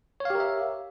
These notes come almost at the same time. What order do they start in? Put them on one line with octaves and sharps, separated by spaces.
C#5 F5 G4 A#4 E5